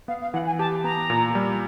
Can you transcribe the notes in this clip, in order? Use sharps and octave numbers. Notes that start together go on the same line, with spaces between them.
B3 F5
F5
E3 F#5
G#5
G4 A5
B3 A#5
A#2
G3